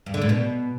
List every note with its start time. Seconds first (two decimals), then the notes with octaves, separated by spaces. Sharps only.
0.06 G2
0.14 D3
0.22 A2
0.29 B2